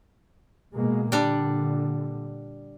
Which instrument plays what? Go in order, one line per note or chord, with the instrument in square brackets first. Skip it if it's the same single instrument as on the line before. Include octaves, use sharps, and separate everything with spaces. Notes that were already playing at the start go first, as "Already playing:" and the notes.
[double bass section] B2 G#3 A#3
[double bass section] A#2 D3 [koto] G3 D4